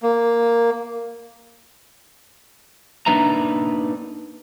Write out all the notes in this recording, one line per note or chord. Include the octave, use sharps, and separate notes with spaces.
A#3
A#3 D4 D#4 B4 E5 A#5